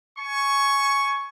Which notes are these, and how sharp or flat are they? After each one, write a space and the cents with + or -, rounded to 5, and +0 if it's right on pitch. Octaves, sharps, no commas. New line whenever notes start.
G#5 +20 C#6 +0